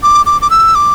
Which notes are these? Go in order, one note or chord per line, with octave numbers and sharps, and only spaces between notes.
D6
D6
D6
E6
D6